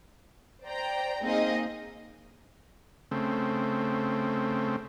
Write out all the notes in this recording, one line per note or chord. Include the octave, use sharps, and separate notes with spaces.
C5 D5 G5 A#5
A#3 C4 D#4 G#4 D#5 F5
C#3 A3 C4